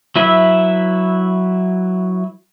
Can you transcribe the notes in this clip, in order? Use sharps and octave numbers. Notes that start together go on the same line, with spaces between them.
F#3 E4 B4 E5